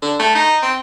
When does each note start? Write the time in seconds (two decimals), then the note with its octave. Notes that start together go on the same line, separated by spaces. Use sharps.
0.02 D3
0.19 A3
0.35 D#4
0.62 C4